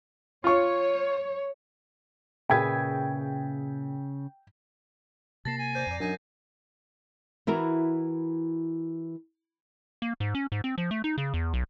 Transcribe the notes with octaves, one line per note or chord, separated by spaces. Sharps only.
F4 C#5 C#6
A#2 C#3 G#4 B4 E5 G5 G#6
C3 A#3 A5 A6 A#6 C7
G#5
C5 D5 A#5 G6
F2 D5 A#5
F#2 D4 D#4 G#5 A#5
E3 E4 F#4 A#4
A#3
G#2
C#4
G#2
C4
F3
A3
D#4
C#3
E2
B1